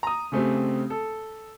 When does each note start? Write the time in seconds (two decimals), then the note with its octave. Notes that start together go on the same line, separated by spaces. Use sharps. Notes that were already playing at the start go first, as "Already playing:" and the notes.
0.03 A#5 D#6
0.32 C#3 A3 C4 G4
0.90 A4